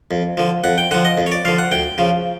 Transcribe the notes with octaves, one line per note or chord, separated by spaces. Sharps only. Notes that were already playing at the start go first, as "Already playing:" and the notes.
F2
D3 F3
F2 F#5
G5
D3 F3 F#5
D#5
F2
C#5
D5
D3 F3 F5
F#5
D2 G5
C#3 F3